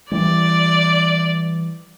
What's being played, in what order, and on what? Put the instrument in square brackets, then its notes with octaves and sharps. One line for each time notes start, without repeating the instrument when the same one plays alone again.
[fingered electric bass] E3 G3 [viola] D5